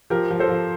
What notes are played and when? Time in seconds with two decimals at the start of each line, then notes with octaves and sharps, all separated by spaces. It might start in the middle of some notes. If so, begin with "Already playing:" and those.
0.10 F3 G4 A#4
0.31 F3
0.39 A4 C5
0.49 F3